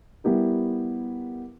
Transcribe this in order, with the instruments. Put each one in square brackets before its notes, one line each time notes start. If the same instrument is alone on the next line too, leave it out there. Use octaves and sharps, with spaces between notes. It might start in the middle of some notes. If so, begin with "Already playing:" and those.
[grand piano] G3 B3 E4 G4 A#4